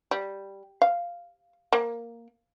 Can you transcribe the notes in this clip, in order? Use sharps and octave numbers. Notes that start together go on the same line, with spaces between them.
G3
F5
A#3